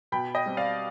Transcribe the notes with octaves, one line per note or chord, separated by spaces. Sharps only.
B2 G5 B5
D#5 G5
G3 C4
D5 F5